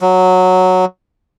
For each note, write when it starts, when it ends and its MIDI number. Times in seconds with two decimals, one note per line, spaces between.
0.01 0.85 54